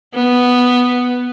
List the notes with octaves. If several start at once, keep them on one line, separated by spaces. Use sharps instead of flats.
B3